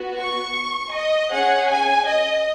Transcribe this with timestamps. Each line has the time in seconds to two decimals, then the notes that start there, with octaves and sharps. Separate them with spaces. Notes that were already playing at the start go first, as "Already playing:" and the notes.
Already playing: B3 F#4
0.21 C#6
0.96 D#5
1.33 C#4 G#4 F#5
1.70 G#5
2.08 D#5